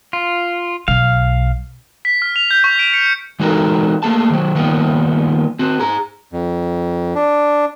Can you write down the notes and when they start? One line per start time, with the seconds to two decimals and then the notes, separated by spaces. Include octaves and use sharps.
0.13 F4
0.88 B1 F5
2.05 B6
2.22 F6
2.36 F7
2.51 G6
2.64 C#6
2.79 D7
2.94 C#7
3.40 E3 G#3 D#4 F#4 A4 A#4
4.03 A3 A#3 G#4 A5
4.30 D#3 F#3
4.55 D#3 F3 G3 A#3 B3
5.59 C4 F#4
5.80 G#4 A#5
6.33 F2
7.15 D4